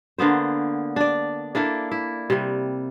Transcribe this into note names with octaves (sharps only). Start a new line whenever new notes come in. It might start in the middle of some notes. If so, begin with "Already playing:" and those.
D3 A#3 B3 C5
D4 D5
A#3 D4 E4 A4
E4
C3 G3